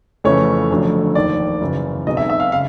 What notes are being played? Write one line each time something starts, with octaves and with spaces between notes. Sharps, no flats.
F2 C#3 E3 A3 C#4 C#5
F1 F2 D3 F#3 A3
F1 D#2 D#3 D5
F#2 C#3 E3
B1 B2 G#3 C4 D#4 D#5
E5
E5
F5
C#3 F5